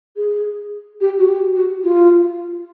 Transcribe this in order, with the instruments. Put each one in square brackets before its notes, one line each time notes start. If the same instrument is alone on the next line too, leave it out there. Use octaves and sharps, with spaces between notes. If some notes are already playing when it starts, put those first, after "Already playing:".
[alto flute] G#4
G4
F#4
G4
F#4
F4